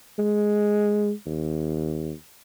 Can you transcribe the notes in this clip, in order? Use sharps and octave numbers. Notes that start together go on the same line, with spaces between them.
G#3
D#2